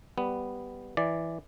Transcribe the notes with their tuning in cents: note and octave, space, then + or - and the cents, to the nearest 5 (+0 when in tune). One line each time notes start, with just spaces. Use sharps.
G3 +0 B3 +0
E3 +0 D5 +0